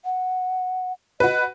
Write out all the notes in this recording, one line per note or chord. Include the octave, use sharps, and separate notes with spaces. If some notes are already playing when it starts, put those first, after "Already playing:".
F#5
F#4 B4 D#5